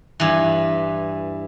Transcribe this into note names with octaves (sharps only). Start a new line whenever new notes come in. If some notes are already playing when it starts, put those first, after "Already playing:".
G2 E3